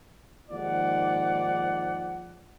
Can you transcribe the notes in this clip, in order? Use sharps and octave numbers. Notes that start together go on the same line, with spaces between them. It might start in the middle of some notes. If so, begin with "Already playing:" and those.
D#2 G#2 F3 D5 F#5